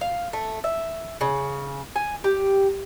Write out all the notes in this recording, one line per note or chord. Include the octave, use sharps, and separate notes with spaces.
F5
A3
E5
C#3
G#5
G4